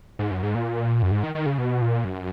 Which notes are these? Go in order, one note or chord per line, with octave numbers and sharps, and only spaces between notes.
G#2
F#2
G#2
A#2
F#2
G#2
D#3
D#3
C#3
B2
A#2
F#2